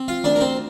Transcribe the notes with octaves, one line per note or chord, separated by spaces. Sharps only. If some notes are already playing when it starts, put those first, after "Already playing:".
Already playing: C4
F4 F5
D2 D4 D5
A#4
C4 C5